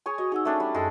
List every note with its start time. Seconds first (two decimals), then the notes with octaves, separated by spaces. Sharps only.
0.06 G#4 C#5 G#5
0.18 F#4 D#5
0.32 D#4 G#4 F#5 E6
0.45 A3 C#4 D4
0.60 G3
0.75 F#2 G#3 A4